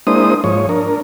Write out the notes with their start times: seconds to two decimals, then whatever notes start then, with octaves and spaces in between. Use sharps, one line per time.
0.07 G#3 A#3 D4 E4 C5 D#6
0.44 G#2 F3 C#5
0.69 D4 A#4